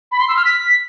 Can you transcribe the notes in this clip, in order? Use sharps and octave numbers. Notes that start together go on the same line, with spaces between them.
B5
C6
E6
F6
B6